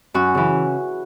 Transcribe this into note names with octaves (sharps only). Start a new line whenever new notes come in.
F#2 F#4
C#3 E3